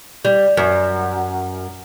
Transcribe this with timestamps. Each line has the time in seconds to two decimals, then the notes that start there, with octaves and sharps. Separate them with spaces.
0.25 G3
0.57 F#2